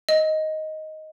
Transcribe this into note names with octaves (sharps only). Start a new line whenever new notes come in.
D#5